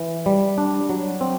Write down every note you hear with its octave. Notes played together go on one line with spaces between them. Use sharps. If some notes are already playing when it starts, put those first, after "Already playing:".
Already playing: E3
G3
D4
F#3
C4